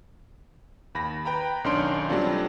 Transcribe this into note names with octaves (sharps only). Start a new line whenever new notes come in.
D#2 B5 A#6
B4 G5 A#5 B5
B1 D#3 C#4 D4 C6 D7
F#3 G3 A3 C4 D4 F4